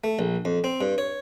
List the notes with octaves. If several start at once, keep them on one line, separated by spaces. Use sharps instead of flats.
A3
A#1
F2
C4
G2
C#5